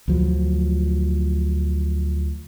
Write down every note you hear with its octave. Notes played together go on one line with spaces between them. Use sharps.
D2 F3 F#3